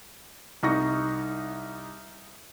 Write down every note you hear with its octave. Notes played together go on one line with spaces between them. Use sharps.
C2 D#4 C#6 A#6